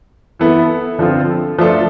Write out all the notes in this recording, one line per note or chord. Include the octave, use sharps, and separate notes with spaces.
E3 B3 E4 A4
D3 F3 C4 F4 A4
F3 A3 D4 F4 A4